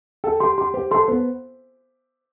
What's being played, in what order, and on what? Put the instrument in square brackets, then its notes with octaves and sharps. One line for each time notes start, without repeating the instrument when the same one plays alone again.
[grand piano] A4 [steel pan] G5
[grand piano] G4 [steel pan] C6
[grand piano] G4 [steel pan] C6
[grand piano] G4 [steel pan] C5
[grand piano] A4 [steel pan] C6
[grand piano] B3 [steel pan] C5